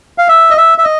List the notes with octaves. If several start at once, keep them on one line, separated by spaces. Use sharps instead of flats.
F5
E5
D#5
E5
E5
D#5